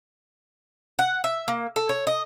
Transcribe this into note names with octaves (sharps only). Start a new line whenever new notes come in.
F#5
E5
A#3
A4
C#5
D#5